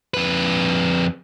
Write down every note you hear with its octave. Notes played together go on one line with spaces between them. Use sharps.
F2 B4